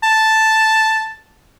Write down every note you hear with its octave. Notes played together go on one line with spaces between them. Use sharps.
A5